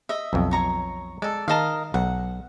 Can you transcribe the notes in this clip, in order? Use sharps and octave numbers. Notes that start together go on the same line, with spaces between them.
D#5 E5
B1 F2
C#5 A#5 C#6
G#3 A4 D5
D#3 A#4 D#5 F5 A5
B1 F#5